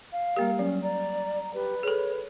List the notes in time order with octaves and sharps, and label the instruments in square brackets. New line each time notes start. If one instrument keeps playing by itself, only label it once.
[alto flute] F5
[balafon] G3 A#3 G4 [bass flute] A#4
[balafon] F#3 [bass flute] C#4
[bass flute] D5 [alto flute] A#5
[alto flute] G4 [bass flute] B4
[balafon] G#4 A4 [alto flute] C#5